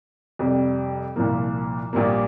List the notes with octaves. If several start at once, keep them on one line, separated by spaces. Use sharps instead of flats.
F2 C3 G3
C2 A#2 F3 A#3
A#1 A#2 G3 A#3